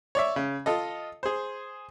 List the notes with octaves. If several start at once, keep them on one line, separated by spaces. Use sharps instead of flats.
C#5 D5 E5
C#3
F4 A4 D#5
G#4 C5